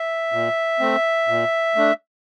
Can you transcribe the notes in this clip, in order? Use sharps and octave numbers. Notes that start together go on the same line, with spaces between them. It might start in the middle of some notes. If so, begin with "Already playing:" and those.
Already playing: E5
A#2
A3 C4
A#2
A3 D4